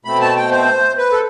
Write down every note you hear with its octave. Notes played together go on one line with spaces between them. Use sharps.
B2 A3 C4 B5
A5
G5
C5
B4
A4